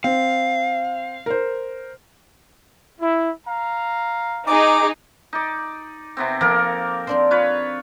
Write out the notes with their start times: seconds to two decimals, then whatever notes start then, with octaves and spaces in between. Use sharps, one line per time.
0.04 C4 F5
1.26 A#4 C5
3.01 E4
3.47 F5 A#5
4.46 D#4 G#4 D6
5.33 D#4 D5
6.17 C3 B3 C4
6.41 F3 A#3 A4 A#4
7.07 C4 D4 C5
7.31 F4 B4 C#5